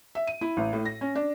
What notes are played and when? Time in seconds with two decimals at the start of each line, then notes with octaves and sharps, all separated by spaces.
0.15 E5
0.27 D#7
0.41 E4
0.57 A1
0.73 A2
0.85 A#6
1.01 C#4
1.15 D4